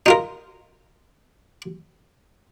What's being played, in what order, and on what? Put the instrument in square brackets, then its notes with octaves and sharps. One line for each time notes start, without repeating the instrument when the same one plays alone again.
[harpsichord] D#4 F4 A#4